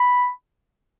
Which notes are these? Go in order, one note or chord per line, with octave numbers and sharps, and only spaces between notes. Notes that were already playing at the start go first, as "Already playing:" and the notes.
Already playing: B5